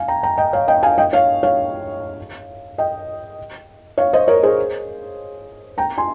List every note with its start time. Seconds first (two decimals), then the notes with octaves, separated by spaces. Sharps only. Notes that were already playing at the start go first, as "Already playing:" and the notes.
Already playing: F5 G#5
0.08 G5 A#5
0.23 G5 A#5
0.38 D#5 G5
0.53 C#5 F5
0.68 D#5 G5
0.83 F5 G#5
0.98 D#5 G5
1.13 C#5 F5
1.43 C#5 F5
2.78 D#5 G5
3.98 C#5 F5
4.13 C5 D#5
4.28 A#4 C#5
4.43 G#4 C5
5.78 G5 A#5
5.98 G#5 C6